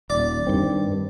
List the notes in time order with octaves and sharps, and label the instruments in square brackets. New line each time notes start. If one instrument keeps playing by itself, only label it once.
[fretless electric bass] D#1 [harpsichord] D5
[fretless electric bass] G2 D#3 C4